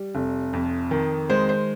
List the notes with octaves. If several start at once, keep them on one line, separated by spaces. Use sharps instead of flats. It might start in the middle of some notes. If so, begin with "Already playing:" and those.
Already playing: G3
F1
F2
D#3
G#3 C5
C5